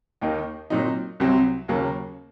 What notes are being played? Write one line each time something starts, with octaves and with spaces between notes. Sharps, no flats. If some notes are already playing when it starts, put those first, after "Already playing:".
D#2 D#3 A#3 D#4
A#2 F#3 C4 D#4
C2 C3 F#3 C4
D#2 C#3 F#3 A#3